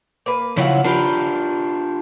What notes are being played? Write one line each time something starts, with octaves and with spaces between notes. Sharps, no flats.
A#3 B4
C#3 F3 F#3 E4 F5 F#5
D4 F4 G4 A#4 B4